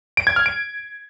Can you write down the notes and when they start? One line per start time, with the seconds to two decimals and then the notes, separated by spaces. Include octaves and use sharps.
0.17 D7
0.27 G#6
0.36 F6
0.46 D7